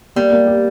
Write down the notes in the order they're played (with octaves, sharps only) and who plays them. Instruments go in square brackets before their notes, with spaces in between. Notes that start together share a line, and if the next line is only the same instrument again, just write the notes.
[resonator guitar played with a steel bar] G3 [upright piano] A#3
[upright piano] A#3
G4